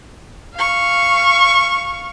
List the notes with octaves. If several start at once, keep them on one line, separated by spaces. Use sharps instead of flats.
F5 C#6